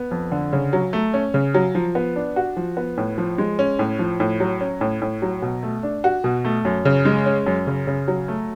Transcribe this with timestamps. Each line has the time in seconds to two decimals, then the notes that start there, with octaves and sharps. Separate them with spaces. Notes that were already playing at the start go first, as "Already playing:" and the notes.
Already playing: B3
0.11 F2
0.32 D3
0.53 C#3
0.73 F#3
0.93 A3
1.14 C#4
1.34 C#3
1.54 F#3
1.75 F3
1.95 B3
2.16 D4
2.36 F#4
2.57 F3
2.77 B3
2.98 A2
3.18 F3
3.38 G#3
3.59 C#4
3.79 A2
3.99 F3
4.20 A2
4.40 F#3
4.61 C#4
4.81 A2
5.02 A2
5.22 F#3
5.42 B2
5.63 A3
5.83 D4
6.04 F#4
6.24 B2
6.45 A3
6.65 F#2
6.85 C#3
7.05 G#3
7.26 C#4
7.46 F#2
7.67 C#3
7.87 C#3
8.08 F#3
8.28 A3